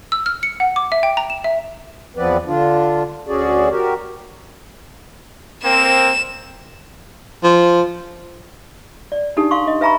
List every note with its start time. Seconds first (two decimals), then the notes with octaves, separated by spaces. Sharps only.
0.12 E6
0.26 F6
0.43 C#7
0.60 F#5
0.76 D6
0.92 E5
1.03 G5
1.17 A#5
1.30 E7
1.44 E5
2.16 E2 F3 B3 C4 B4 D5
2.46 D3 D4 F4
3.27 D2 C#4 F#4 G#4 D5
3.70 F#4 G4 A#4
5.64 A#3 C4 E7
7.43 F3
9.12 D5
9.37 D4 D#4 G4 A4
9.51 F5 C6 C#6
9.67 D#5
9.81 B4 E5 G#5 A#5 B5 C#6